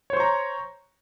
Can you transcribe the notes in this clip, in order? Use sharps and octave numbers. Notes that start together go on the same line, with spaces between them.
C5 C#5 A#5 C#6